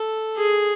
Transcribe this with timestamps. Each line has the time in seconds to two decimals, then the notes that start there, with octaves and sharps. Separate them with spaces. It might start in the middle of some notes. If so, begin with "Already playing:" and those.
Already playing: A4
0.37 G#4